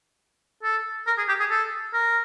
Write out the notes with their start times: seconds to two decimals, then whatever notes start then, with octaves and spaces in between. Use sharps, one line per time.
0.63 A4
1.07 A#4
1.18 G#4
1.28 G4
1.40 G#4
1.50 A4
1.93 A#4